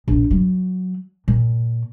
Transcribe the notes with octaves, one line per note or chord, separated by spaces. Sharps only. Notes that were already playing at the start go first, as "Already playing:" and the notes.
A#1 F3
F#3
A#2